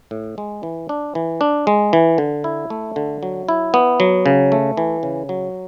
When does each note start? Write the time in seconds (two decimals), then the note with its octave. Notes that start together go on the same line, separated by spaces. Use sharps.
0.11 A2
0.38 G#3
0.63 E3
0.89 D4
1.15 E3
1.41 D4
1.67 G#3
1.93 E3
2.18 D3
2.44 E4
2.70 A3
2.96 D3
3.23 F#3
3.49 E4
3.74 B3
4.00 F#3
4.26 C#3
4.52 A3
4.77 E3
5.03 C#3
5.29 F#3